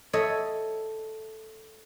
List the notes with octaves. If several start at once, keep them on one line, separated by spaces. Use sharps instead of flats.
A4 C#5 D#5 E5